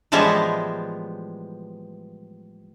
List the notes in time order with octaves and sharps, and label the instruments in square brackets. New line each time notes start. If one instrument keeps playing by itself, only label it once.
[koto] A2 E3 F3 G3 G#3 B3